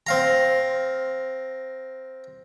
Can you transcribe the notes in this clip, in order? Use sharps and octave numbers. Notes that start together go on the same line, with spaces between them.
C4 F5 A#5